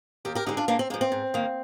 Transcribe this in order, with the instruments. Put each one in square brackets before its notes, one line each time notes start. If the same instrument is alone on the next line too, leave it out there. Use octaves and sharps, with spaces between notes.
[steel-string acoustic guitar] D#2 G4 A#4
G4 A#4
D3 G#3 D#4 G4
D4 F4
G#2 A#3 D4
C4
G#3 A#3
F3
C4
G#2
D#3 A#3